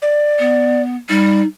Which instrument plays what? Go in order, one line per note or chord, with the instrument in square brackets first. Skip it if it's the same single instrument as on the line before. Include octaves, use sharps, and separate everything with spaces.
[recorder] D5
[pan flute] B3
[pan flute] G3 [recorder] D#4